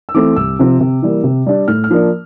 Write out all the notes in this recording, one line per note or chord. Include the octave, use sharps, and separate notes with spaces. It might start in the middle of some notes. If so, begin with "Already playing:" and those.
E6
E3 A3 C4 D6
C2 E6
C3 F3 C4
C3
E3 G3 A#3
C3
G3 D4
A2 F6
F6
F3 A#3 D4